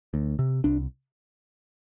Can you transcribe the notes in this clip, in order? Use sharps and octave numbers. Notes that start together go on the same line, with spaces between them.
D2
C3
C2 D4